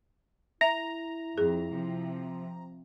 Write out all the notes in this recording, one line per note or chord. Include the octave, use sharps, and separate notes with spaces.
E4 E5 A#5
F2 G#4
C3 F3